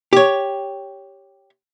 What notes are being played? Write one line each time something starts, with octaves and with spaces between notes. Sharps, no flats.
G4 C#5